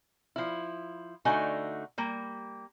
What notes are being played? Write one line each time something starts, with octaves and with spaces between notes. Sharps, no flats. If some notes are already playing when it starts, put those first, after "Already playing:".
F3 E4
D3 A3 D#4 F#4 G#5
G3 A#3